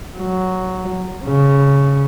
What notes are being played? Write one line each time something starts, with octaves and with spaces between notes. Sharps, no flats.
F#3
C#3